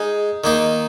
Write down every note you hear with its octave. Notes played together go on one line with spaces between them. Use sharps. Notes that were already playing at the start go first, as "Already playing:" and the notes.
Already playing: G#3 D#4 G#4
D#3 A#3 D#4